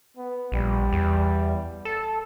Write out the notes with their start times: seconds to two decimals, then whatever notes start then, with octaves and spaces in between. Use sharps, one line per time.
0.17 B3
0.52 A#1 G3
0.93 E2
1.85 A4